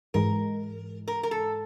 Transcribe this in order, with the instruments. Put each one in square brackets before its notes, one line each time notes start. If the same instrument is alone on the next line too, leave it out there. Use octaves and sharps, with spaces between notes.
[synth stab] G#2 E3 G#3 [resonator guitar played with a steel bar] A#4
[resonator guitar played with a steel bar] A#4
A#4
A4